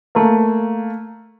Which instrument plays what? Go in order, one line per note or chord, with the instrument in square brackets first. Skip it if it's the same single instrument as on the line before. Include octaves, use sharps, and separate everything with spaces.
[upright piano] A3 A#3